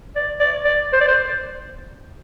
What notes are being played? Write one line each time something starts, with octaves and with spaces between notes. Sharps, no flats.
D5
D5
D5
C5
D5
C5